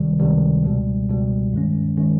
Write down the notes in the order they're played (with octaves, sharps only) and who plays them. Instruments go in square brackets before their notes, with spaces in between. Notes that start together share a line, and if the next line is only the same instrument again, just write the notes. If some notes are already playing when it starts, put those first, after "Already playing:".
Already playing: [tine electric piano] C#2 C3 D#3 G3
C#2 C3 D#3 G3
C#2 B2 G3
C#2 B2 G3
G2 D#3 G#3 C#4
D#3 G#3 C#4